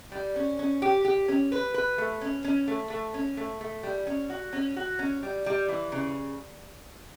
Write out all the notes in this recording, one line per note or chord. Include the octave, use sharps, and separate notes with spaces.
G3
C#4
C#4
G4
G4
C#4
B4
B4
A3
C#4
C#4
A3
A3
C#4
A3
A3
G3
C#4
F#4
C#4
F#4
C#4
G3
G3
E3
C#3